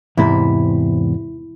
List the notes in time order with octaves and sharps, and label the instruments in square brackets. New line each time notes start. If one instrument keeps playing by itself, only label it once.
[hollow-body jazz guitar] E2 G#2 C3 [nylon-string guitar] E4